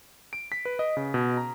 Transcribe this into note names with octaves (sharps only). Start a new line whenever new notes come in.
D7
B6
B4
D#5
C#3
B2
A#5